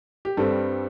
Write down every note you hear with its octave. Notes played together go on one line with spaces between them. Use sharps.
G4
G2 G3 C4 A4